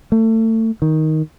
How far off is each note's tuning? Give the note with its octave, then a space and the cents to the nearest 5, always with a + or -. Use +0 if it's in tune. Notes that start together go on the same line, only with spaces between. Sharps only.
A3 +30
D#3 +10